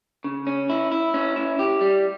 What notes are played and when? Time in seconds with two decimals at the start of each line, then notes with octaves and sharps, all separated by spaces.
0.24 C#3
0.47 C#4
0.69 E4
0.92 E4
1.14 C#4
1.36 E4
1.59 G4
1.81 G3